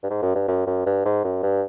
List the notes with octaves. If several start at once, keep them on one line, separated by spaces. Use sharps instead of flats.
G2
G#2
F#2
G2
F#2
F#2
G2
G#2
F#2
G2